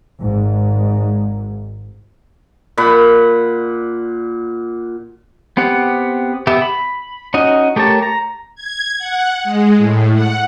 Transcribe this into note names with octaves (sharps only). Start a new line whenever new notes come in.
G#1 G#2
A#2 F#5 B5
B3 C4 G4 F#5
B3 G4 E5
B5
C#4 D#4 F#4 D#5
A3 G4 A#4 C#5 A5
A#5
G#6
F#5
G#3
A2
F#5